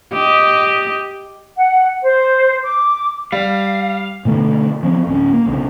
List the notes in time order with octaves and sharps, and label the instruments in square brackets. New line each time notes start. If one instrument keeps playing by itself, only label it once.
[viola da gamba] G4 D#5
[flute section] F#5
C5
D6
[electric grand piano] G3 [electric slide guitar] F5
[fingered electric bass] B2 D3 A3 B3
F3 B3 C4
D1 C#4
A#3
B1 C#3 B3